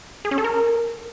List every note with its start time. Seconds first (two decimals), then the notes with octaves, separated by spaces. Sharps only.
0.25 G#4
0.31 C#4
0.38 A4
0.44 A#4